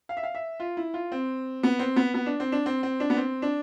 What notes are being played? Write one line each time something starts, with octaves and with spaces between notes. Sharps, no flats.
F5
E5
F5
E5
F4
E4
F4
C4
B3
C4
B3
B3
D4
C4
D4
C4
C4
D4
B3
C4
D4